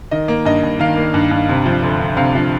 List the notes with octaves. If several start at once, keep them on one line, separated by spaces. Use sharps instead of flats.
D#3 D#5
A#3
G2 D#5
G2
D#3 F5
A#3
G2
G2
C3
F3
D2
D2
C3 F5
F3